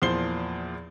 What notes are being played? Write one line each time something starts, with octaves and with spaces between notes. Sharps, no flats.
E2 A#2 F3 C5 C7 G7